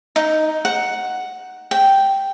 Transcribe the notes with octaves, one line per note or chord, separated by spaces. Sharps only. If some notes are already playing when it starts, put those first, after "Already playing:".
D#4
F#5
G5